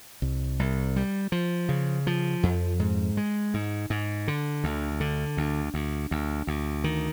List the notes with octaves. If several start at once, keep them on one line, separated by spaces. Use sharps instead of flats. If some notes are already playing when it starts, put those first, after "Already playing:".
C2
C2
G3
F3
C#3
F3
F2
G#2
G#3
G#2
G#2
D3
D2
D3
D2
D2
D2
D2
D#3